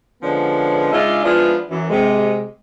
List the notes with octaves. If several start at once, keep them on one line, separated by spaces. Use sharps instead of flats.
D3 F3 G#3 B3 C#4 D4
C#3 G#3 D4 D#4 F4 E5
F3 G#3 B3 D4 E4 F4
F#2 E3
C3 G#3